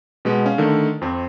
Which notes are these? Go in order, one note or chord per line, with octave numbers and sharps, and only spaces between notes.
B2 G#3 B3
C#4 F5
D3 D#3 A3
F2 C4